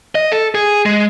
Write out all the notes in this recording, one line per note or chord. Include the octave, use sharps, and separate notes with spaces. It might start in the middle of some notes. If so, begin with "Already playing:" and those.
D#5
A4
G#4
G#3